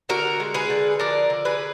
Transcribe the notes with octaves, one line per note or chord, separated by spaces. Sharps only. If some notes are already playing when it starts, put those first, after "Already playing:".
D3 F#4 A#4
G#3
G#4 B4
D3
F3 A#4 D5
D3
G#4 B4